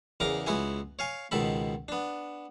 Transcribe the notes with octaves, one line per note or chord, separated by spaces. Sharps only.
E2 C#3 A#4 A#5 D6
C#2 B3 E4 F#4 G#5
C#5 F5 G#5
C#2 B2 D#3 A4 B5
B3 D4